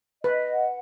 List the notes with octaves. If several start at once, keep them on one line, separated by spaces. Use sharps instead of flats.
B4 D#5
F#5